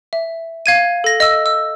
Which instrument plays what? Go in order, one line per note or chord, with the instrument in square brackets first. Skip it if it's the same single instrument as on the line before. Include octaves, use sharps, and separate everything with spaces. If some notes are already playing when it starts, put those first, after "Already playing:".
[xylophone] E5
F5 G#6 D#7
A4 A#6
D#5 E6
E6